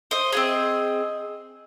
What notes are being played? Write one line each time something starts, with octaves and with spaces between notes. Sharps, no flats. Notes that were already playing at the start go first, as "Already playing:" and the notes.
C5 D#5
C4 F4 G#4